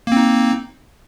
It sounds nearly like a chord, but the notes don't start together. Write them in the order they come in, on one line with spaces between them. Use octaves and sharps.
A#3 C4 D#4